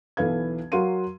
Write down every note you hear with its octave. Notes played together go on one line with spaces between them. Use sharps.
B1 E3 A4 B4 F5 G#6
F#3 F#4 A#4 F5 C6 D#7